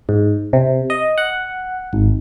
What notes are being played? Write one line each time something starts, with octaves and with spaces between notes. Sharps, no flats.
G#2
C3
D#5
F#5
G#1